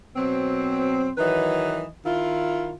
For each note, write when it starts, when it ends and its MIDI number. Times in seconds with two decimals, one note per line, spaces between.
0.16 1.11 47
0.16 1.11 54
0.16 1.11 60
1.18 1.87 51
1.18 1.87 52
1.18 1.87 54
1.18 1.87 71
1.18 1.87 75
2.06 2.74 51
2.06 2.74 64
2.06 2.74 65